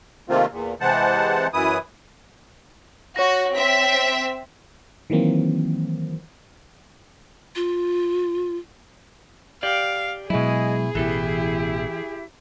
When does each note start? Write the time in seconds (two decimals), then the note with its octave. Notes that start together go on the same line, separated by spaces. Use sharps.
0.29 C3 D#3 A3 A#3 C4 F4
0.51 E2 A#2
0.81 C3 E3 G#3 C5 F#5 A5
1.53 F#2 E3 E4 D#6
3.16 F#4 C#5 A#6
3.54 C4 E5 B6
5.10 D#3 E3 F#3 A#3 C4
7.56 F4
9.63 G4 D5 F5
10.30 B2 F#3 G#3 E4 G#4 D#5 G#5
10.95 A1 B2 E3 E4 G4 A4 E5